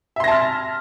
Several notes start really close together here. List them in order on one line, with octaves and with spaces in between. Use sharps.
E5 C6 A#6 A5 F6